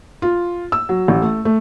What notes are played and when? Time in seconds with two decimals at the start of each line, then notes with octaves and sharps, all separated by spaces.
0.22 F4
0.72 E6
0.89 F#3
1.08 A1
1.22 A3
1.45 A3